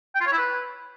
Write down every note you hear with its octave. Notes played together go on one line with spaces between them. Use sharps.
G5
F4
C#5
E4
B4